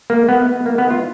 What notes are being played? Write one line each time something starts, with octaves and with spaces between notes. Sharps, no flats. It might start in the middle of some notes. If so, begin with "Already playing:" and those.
A#3
B3
B3
A#3
B3
F4